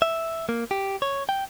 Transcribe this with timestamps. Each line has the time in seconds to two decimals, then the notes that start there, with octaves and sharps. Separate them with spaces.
0.02 E5
0.49 A#3
0.71 G4
1.02 C#5
1.29 G5